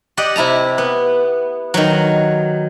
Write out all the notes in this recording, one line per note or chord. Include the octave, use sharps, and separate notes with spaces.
G4 D5 D#5 F#5
C3 E4 A5 A#5
B3
D#3 F#3